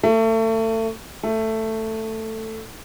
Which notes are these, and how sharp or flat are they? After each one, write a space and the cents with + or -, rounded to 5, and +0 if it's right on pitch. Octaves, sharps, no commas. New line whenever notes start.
A3 +30
A3 +10